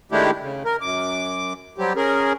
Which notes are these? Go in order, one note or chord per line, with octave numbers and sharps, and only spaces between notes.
D#3 G#3 A3 D4 E4 G4
C#3
A#4
F#2 D6
F#3 G3 C4 G4
C#4 G#4 A#4